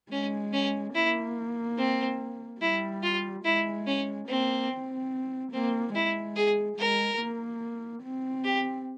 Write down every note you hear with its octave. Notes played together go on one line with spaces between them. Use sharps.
G#3 C#4
C#4
A#3 E4
C4
G3 E4
F4
G#3 E4
C#4
A#3 C4
C4
A#3 C4
G#3 E4
G#4
G#3 A#4
A#3
C4
G4